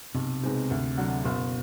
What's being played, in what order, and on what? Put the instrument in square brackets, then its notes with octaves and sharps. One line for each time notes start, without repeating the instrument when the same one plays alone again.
[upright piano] B1 [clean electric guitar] C3
[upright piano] B2 G#3 C4 D#4
D2
D3 F#3
[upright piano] F#1 [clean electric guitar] B2